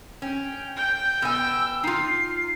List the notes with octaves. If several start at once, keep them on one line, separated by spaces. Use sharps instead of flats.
C#4 G5
G5 G6
B2 G#5 E6
D#4 F4 C7